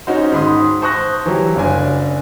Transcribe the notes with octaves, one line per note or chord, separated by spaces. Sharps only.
C#4 D#4 F#4 C5
G#2 D#3 B5 C6 D#6
C5 A5 C#6 D#6 F#6 A#6
E3 F#3 G3
F#1 C#4 D4 G#5